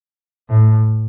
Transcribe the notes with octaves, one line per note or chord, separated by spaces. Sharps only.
A2